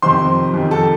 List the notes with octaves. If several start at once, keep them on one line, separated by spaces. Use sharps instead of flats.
F2 C3 D#3 C5 C6
F2 C3 D#3
A4 A5